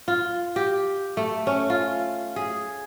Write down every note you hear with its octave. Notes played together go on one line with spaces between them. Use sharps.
F4
G4
A3
C#4
F4
G#4